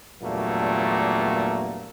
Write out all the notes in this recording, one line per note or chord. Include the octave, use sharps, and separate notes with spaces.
E2 G2 A#2 F#3 A3 A#3